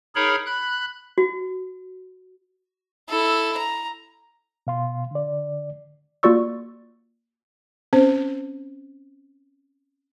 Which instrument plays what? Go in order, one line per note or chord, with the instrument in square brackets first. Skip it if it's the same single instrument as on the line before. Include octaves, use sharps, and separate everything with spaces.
[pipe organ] D#4 G#4 A#4 C#5 B5
B5 F#6
[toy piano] F#4
[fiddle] E4 A4
A#5
[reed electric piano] B2 F5 C6
D3 D5
[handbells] A#3 F4 F#4 D5 C#6 E6
[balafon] C4 C#4 C5